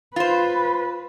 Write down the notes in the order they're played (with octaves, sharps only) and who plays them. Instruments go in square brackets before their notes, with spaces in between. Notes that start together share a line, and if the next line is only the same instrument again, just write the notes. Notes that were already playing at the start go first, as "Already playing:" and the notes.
[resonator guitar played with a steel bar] F4 C5 [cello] B4